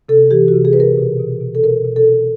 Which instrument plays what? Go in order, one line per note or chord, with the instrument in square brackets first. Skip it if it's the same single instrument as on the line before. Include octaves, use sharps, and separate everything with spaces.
[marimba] C3 A4
E3 G4
F#4
C3
G#4
C3 B4
A#4
B2
B2
B2
A4
B2 A#4
B2
A4
B2